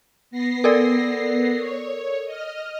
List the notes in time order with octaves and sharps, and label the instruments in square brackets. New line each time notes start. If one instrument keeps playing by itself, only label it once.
[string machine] B3 A#6 C7
[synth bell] A4 A#4 D5
[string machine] C#5
D#5 F6